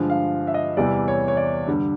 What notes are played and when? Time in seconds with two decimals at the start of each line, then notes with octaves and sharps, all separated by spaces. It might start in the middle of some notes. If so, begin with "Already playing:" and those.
Already playing: G2 D3 F3 G#3
0.10 F5
0.47 E5
0.54 D#5
0.77 E2 C3 E3 G3 D5
1.08 C#5
1.28 C#5
1.37 D5
1.67 G2 D3 G3